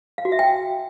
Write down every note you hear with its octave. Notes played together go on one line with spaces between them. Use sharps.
F5
F#4
E5
G5